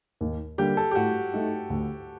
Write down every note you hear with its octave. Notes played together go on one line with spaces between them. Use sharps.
D#2
D3 G3 A#3 G4
A4
G4
A2 F#4
A3 D#4
D2